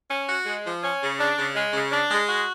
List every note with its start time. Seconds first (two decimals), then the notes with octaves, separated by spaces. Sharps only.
0.10 C#4
0.28 F#4
0.46 G#3
0.65 F3
0.83 C#4
1.01 C#3
1.19 D4
1.38 C#3
1.55 G#3
1.73 C#3
1.92 D4
2.10 G#3
2.28 F#4